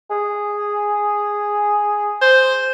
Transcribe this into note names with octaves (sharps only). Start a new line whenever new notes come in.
G#4
C5